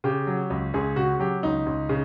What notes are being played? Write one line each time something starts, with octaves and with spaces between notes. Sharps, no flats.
C#3 G4
F#3
C#2
C#2 G#4
C#3 F#4
F#3 G4
C#2 D#4
C#2
C#3